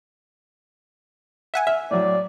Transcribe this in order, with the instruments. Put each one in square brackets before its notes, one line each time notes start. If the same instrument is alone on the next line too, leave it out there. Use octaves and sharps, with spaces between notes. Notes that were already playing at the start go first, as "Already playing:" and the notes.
[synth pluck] E5 F#5 G#5
[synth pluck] E5 [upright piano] F6
[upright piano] A2 F#3 [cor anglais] D5